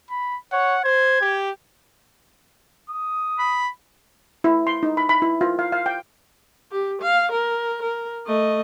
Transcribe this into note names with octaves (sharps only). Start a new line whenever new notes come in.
B5
C#5 F#5
C5 G#6
G4
D#6
B5
E4
C6
D#4
B5
B5
E4
F4
F5
F5
G5
G4
F5
A#4
A#4
A3 D#5